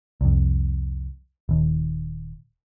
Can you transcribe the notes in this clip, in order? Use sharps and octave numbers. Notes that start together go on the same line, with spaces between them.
C2 F2
D#1 D#2